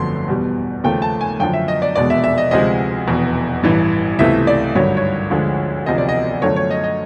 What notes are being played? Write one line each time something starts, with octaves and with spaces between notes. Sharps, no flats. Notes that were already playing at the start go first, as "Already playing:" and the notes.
Already playing: G1 F2 D3 F#3 A3 C6
E2 B2 G3
D#2 C#3 F3 A3 G5
A5
G#5
F#2 D3 F3 G5
E5
D#5
D5
F1 E2 B2 G#3 D5
E5
E5
D#5
D2 C3 F3 G#3 D#5
F1 E2 B2
A1 G2 E3
C#2 C3 E3 A3 E5
D5
G#1 G2 D3 F#3 C#5
C#5
D2 D3 F3 G#3
E1 D2 C3 F3 D#5
D5
D#5
F#2 D3 F3 A3 C#5
C#5
D#5
D#5